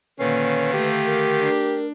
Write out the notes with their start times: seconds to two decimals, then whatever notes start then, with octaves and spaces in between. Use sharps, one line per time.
0.19 A#2 D3 D#3 C#4 B4 F5
0.74 A3 G4
1.05 A#4
1.39 D4